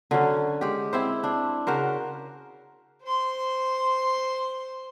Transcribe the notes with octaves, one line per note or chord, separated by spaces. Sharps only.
D3 F#3 C#4
G#3 G4
C4 E4 C5
D4
C#3 F#4 A#4 C5
C5 C6